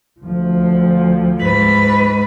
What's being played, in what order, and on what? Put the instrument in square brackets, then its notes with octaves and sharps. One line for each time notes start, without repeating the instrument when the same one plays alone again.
[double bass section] D2 F3
[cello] G#2 B4